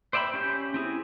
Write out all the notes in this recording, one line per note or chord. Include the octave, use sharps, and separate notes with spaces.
C5 D5 E5 G5 B5
C#4 G4 G6
C4 E4 G#4